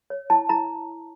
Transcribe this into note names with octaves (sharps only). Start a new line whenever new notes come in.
C#5
E4 A5
E4 A#5